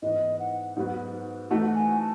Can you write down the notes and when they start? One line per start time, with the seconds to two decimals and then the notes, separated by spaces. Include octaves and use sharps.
0.02 G#2 E3 B3 D#5
0.40 F#5
0.76 G#2 F#3 B3 F#4
1.50 E3 A3 D#4 F#4 F#5
1.75 G#5
2.00 A5